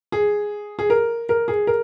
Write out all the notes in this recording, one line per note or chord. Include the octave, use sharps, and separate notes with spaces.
G#4
G#4
A#4
A#4
G#4
A#4